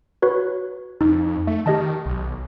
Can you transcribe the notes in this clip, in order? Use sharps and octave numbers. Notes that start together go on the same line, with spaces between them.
F#4 B4 C#5
F2 D#4
A3 E5
D#3 G4 D#5 A5
B1